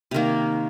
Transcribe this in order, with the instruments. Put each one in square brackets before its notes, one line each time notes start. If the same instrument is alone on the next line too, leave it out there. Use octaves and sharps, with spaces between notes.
[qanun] C3 D#3 A#3